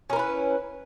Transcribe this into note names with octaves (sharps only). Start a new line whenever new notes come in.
C#4 E4 A#4 B4